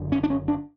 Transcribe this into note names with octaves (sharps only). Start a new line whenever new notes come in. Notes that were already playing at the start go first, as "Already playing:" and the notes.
Already playing: F#1 F#2 D3
C#4
D4
C#4
D4